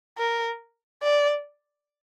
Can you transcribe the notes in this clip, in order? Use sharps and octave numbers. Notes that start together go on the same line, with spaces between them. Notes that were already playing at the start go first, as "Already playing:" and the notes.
A#4
D5